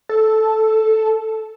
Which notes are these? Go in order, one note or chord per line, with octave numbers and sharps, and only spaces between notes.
A4